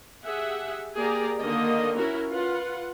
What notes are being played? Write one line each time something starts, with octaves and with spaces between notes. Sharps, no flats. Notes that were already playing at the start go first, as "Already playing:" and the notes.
G4 G#4 E5 F#5
A#3 G4 G#4 D5 A#5
D3 D#3 A#3 D#5
C#4 E4 F#4 A#4
F4 B4 F#5